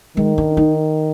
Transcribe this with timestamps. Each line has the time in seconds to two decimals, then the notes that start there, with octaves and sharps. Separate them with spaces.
0.17 D#3 G#3
0.38 D4
0.57 D#4